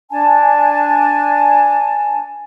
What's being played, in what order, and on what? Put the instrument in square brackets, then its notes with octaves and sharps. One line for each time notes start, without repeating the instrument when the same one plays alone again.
[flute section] D4 G#5 A5